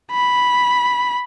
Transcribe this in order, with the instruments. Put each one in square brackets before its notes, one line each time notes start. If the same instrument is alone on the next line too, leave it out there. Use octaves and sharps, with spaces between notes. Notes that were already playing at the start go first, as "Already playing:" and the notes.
[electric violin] B5